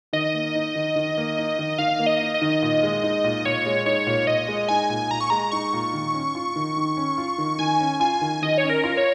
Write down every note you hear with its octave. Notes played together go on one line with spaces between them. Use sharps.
D#3 D#5
A#3
D#4
D#3
D#3
A#3
D#4
D#3
D#3 F5
A#3
D#5
D#4
D#5
D#3
A#2
G#3
D#4
A#2
A#2 C#5
G#3
D#4 C#5
A#2
A#2 D#5
G#3
D#4 G#5
A#2
A#2 A#5
C#6
G#3 A#5
D#4 C#6
A#2
D#3
C#4
F4
D#3
D#3
C#4
F4
D#3
D#3 G#5
C#4
F4 G#5
D#3
D#3 D#5
C#5
C#4
A#4
F4
C#5